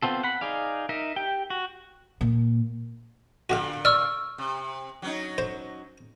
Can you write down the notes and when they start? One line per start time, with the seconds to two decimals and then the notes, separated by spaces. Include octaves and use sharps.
0.03 B3 C4 F4 A4
0.24 F#5 B5
0.41 D#4 G#4 D5 F5
0.89 D#4 A#4 E5
1.16 G4 G5
1.50 F#4
2.21 A#2
3.50 A#2 D3 F#4 G4 F5
3.85 D5 C#6 E6 F6
4.38 C3
5.02 F#3 C#4 D#4
5.38 C5